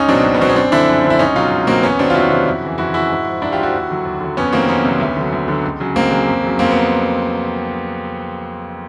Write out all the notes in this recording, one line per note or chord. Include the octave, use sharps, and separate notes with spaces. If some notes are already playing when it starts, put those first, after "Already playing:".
Already playing: C#2 C#4 D#4
B2 F#3 C4 D4
C#2
B3
B2 F#3 C4
C#4
F#2 C4 D4
D3 F3 D4 E4
F#2
D3 F3
E4
C#2 C#4 D#4
B2 F#3 D#4 F4
C#2
B2 F#3 A#3 C4
E2 B3 C#4
C3 D#3 F#3 C4 D4
F4
E2 E4 F#4
C3 D#3 F#3
F2
C#3 E3
F2 E4 F#4
C#3 E3 E4 F#4
G#2
F3
G#2 D4 E4
F4 G4
F3
E4 F#4
D#2
D3 F#3
D#2
D3 F#3
F2 B3 C#4
C3 D#3 F#3 A#3 C4
F2 B3 C#4
C3 D#3 F#3
D2
D3 F#3
D2
D3 F#3
C#2
C#3 F#3
C#2 A#3 C4
C#3 F#3
F2
C#3 F#3
F2 A#3 C4
B3